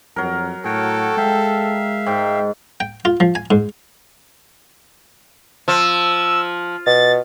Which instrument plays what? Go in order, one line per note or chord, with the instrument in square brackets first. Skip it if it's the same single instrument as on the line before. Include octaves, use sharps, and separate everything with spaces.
[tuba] F2 [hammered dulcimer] F#3 A#4
[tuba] A2 [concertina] F#4 C#5 G5 [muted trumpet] A4
[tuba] G#3 [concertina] E5 F5 [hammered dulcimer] G5
[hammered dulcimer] G#2 [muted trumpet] G5
[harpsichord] G5
F4
F3
G#5
G#2
[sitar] F3 [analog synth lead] E6
[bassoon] B2 [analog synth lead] A6